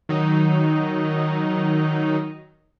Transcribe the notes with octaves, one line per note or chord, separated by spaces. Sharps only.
D#3 F#3 D#4